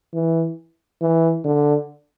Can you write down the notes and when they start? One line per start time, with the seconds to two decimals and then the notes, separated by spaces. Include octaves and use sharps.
0.14 E3
1.02 E3
1.44 D3